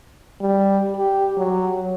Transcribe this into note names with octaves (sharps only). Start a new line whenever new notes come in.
G3
G4
F#3